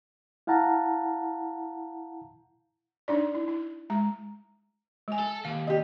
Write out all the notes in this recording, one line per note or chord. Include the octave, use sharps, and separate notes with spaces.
E4 F5 F#5 A5 A#5
D4 D#4 D5
E4
E4
G#3 A#5
G#3 G#5
A4
D#2 F5
G4 D#5